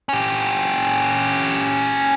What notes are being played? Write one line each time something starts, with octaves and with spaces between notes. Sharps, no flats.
C#4 G4